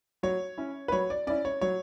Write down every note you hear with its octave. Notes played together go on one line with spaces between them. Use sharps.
F#3 C#5
C#4 E4
B4
F#3 C#5
D5
C#4 E4 D5
C#5
F#3 C#5